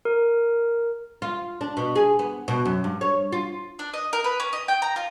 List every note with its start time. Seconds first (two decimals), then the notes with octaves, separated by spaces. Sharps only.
0.05 A#4
1.22 F4
1.61 D4
1.77 B2
1.95 G#4
2.19 B3
2.48 B2
2.65 F#2
2.84 G2
3.01 C#5
3.32 F4
3.79 D4
3.94 D#5
4.13 A#4
4.24 B4
4.40 C#4
4.53 D#5
4.68 G5
4.82 A#5
4.96 F4